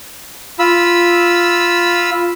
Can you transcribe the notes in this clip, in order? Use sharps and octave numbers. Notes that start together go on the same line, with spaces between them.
F4 B5 E6